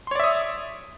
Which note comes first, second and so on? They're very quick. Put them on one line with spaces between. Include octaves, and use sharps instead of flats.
C6 C#5 D5 E5 D#6